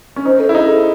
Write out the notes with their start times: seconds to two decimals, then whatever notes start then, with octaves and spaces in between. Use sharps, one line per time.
0.16 C#4
0.25 D#4 C5
0.40 A4
0.49 E4
0.54 D#4 G#4
0.68 A4